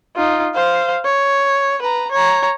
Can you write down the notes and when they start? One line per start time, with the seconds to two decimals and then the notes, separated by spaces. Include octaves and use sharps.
0.16 D#4 F4
0.54 C5 F5
1.05 C#5
1.82 B4 A#5
2.12 C#5 A#5